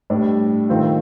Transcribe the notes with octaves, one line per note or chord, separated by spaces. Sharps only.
A2 G3 D4
D#3 A3 C4 F4